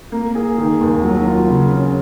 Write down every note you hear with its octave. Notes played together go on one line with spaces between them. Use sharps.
A#3
G#4
D#3
D#2
F#3
F4
C#3
C#4